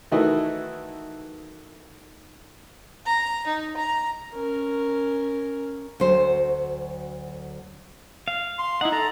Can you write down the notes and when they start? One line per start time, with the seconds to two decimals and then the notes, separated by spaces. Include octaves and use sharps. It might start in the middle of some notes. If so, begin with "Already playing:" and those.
0.12 D#3 E3 A3 D#4 E4 F#4
3.06 A#5
3.47 D#4
3.77 A#5
4.34 C#4 A#4
6.00 D2 F#3 C5
8.28 F5
8.58 C6
8.81 D#4 E4 F#5
8.92 A4 A#5